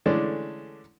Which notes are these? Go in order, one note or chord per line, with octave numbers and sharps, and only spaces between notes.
D3 E3 G#3 A3 C#4 D4